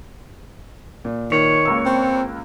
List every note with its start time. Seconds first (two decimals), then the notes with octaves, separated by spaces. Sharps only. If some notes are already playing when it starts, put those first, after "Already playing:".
1.05 A#2
1.32 D#3 C#5
1.65 C#2 A#3 E6
1.86 C4